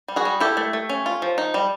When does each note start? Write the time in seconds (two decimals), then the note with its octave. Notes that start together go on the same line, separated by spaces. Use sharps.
0.08 G3
0.16 F#4 G#4
0.25 G3
0.40 E4 G4 A4
0.57 A3
0.73 A3
0.89 C#4
1.06 F4
1.22 F3
1.38 D#4
1.54 G3